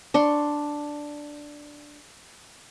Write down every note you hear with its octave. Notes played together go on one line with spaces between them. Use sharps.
D4 C6 C#6